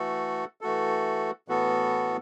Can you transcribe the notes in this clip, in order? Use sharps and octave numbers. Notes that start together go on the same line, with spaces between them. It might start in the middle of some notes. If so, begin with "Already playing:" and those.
Already playing: E3 A3 F#4 A4
E3 A3 F#4 A4
A2 E3 B3 F#4 A4